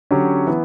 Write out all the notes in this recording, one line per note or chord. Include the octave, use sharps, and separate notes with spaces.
D3 F#3 C#4 G4
E3 B3